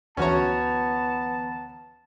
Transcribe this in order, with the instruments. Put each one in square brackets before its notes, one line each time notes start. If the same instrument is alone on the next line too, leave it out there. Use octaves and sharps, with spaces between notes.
[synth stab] D2 E3 A#5 [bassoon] B3 [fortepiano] C#4 F#4 C#5 [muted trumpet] A5